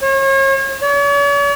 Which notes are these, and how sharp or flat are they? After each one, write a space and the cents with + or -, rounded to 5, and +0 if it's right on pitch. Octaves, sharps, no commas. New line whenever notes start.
C#5 -40
C#5 +45